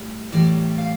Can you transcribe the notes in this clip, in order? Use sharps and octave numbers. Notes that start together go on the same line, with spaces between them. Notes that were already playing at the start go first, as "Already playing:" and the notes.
Already playing: A2 G3
A2 E3 G3 D5
F5